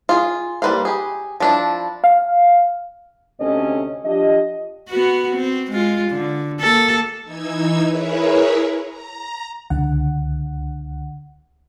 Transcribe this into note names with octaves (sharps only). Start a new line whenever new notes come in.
F4 G#4
G3 A#3 B4 C5 F5
G4 G#4
F3 D4 E4
F5
D2 C3 C#4 A4 C#5 D#5
F3 D4 G4 D#5
B3 F#4
C4
G#3 F4
D3
A#3 A4
E3 D#4 E6 G#6
E4 G#4 A#4 B4 C#5 E5
A#5
C#2 D3 F#5